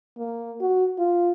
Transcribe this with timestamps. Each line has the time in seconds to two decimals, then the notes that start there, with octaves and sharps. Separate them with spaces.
0.18 A#3
0.61 F#4
0.99 F4